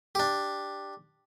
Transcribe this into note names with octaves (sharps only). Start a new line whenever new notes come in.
D4 G4